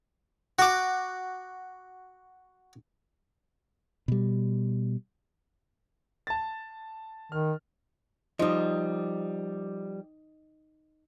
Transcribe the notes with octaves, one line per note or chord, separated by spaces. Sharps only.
F#4 D6
B2 G3
A5 A6
D#3 F6
F3 G3 D#4 D#5